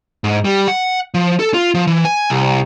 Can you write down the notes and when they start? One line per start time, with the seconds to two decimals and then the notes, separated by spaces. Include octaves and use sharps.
0.24 G#2
0.45 G3
0.68 F#5
1.14 F3
1.40 A4
1.54 F4
1.74 F3
1.87 E3
2.05 G#5
2.30 C2